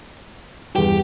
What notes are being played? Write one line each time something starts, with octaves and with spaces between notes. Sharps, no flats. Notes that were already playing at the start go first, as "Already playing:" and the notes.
E2 G2 G4